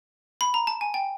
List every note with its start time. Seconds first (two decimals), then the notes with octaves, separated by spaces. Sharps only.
0.41 B5
0.54 A#5
0.67 A5
0.81 G#5
0.94 G5